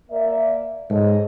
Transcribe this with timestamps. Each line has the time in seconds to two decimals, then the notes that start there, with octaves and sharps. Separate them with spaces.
0.10 A#3 D5 E5
0.91 G#2 A4 C#5 D#5